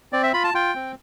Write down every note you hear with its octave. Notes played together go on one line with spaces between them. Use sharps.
C4 D5
E5
F4 B5
A5
F4 G5
C4